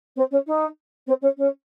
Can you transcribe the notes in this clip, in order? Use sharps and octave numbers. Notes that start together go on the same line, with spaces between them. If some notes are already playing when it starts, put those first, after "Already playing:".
C4
C#4
D#4
C4
C#4
C#4